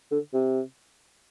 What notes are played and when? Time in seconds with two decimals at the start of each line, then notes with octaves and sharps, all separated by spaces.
0.11 D3
0.33 C3